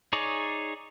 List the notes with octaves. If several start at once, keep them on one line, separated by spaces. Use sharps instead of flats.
D#4 G#4 C#5 D5